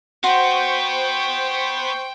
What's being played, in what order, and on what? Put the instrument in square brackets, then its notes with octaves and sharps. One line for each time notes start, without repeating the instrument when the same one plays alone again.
[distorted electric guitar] B3 [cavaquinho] F#4 C6 [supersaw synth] C5 C#6 G6 [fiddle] G5